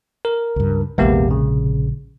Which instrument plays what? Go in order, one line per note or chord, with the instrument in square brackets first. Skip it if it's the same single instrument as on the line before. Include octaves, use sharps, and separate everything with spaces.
[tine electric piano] A#4
[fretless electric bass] C#2 G2
[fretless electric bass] A#1 C3 G#3 [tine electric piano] E2 A#3 G4
[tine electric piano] C#3